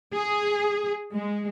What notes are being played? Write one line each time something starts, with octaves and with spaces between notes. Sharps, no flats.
G#4
G#3